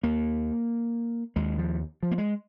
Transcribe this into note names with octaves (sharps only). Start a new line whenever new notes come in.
D#2 A#3
D#2 G#3
F3
F3
A#3
G#3